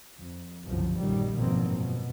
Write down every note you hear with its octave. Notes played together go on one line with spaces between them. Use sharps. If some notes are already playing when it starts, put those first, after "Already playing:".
F2
G1 C2 F#2 C#3 F3
A#1 F#2 D#3 G3
G#1 F#2 B2 F3 A#3 C4
B2